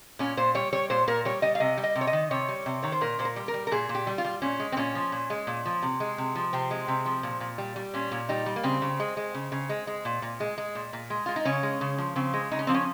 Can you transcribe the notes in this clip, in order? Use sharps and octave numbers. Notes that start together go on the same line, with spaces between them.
A#2 C#4
A#2 C5
G3 C#5
G3 C#5
A#2 C5
A#2 A#4
G3 C#5
G3 D#5
F5
C3 D#5
G3
D#5
C3
C#5
D#5
D#3
C3 C#5
G3
C3
D#3 C#5
C5
A#2 A#4
A#2 C5
A#4
G3
A#4
G3
A#4
A#2 G#4
A#2
G4
G3
F4
G3
A#2 C#4
G#3
C4
A#2 C#4
F3
A#2
G#3
A#2
F3
C3
G#3
C3
F3
C3 C4
G#3
C3
F3
A#2
A#2
G3
G3
A#2 C#4
A#2
G3 D#4
G3
A#3
C#3 C4
C#3
G#3
G#3
C#3
C#3
G#3
G#3
A#2
A#2
G#3
G#3
A#2
A#2
G#3
G#3 F4
D#4
C#3 C#4
G#3
C#3
F3
C#3 C4
G#3
C#3 D#4
C#4
F3 C4
C#4